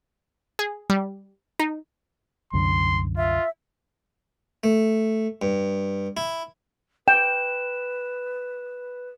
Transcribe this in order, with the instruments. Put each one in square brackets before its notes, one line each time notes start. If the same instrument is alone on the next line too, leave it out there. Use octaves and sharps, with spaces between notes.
[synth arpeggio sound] G#4
G3
D#4
[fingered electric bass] C2 F#2 D3 [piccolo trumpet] C6
[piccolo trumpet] F4 [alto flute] E5
[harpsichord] A3
G2
E4
[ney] B4 [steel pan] G5 [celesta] E7